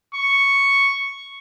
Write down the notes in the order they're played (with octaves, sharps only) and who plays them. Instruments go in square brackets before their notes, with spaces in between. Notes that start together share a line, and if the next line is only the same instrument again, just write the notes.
[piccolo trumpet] C#6